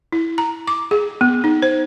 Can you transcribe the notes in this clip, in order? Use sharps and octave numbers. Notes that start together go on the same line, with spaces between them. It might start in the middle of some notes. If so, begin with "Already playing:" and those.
E4
A#5
D6
G#4
B3
D#4
C5